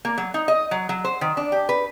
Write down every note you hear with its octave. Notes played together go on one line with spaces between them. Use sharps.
A#3
F#3
D#4
D#5
F#3
F#3
C5
D#3
D4
G4
B4